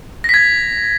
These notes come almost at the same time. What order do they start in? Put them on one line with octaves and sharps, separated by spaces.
A#6 B6 G#6